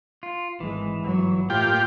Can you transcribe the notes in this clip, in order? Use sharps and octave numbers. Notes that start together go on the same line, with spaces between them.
F4
G#1 E3 G#3
G1 F#3
A2 A#3 F4 G4 G5